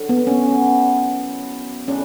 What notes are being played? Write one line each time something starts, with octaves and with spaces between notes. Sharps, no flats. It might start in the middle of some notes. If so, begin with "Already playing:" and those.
Already playing: F#2 D3 F#3
B3
C#4
B2 F#3 B3 E4
A2 E3 G3 C#4 D4